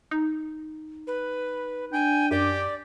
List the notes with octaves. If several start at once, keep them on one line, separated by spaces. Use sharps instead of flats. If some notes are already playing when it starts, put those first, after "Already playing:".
D#4
B4
D4 G5 G#5
F#2 G4 D5